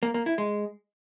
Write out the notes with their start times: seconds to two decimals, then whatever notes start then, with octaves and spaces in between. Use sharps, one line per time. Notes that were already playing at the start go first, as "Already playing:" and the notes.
0.03 A#3
0.14 A#3
0.26 E4
0.38 G#3